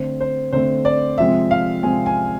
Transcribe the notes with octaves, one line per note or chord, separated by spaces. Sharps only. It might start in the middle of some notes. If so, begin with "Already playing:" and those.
Already playing: D3 A3 C4 C5
C5
D3 A3 C4 C5
D5
C3 F3 G#3 C4 E5
F5
C3 F3 G#3 C4 G#5
G#5